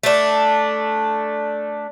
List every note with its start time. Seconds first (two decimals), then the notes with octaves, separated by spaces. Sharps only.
0.03 A3 D4